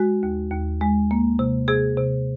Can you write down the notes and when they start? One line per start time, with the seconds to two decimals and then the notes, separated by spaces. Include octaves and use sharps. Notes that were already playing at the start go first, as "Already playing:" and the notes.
Already playing: G#3 F#4
0.23 D#2
0.52 D#2
0.81 G#3
1.11 A#3
1.39 C3
1.68 C3 G#4
1.98 C3